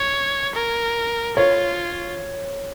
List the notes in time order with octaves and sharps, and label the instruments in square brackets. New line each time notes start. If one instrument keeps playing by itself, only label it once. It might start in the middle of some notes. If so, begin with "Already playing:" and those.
Already playing: [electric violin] C#5
A#4
[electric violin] F4 [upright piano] C#5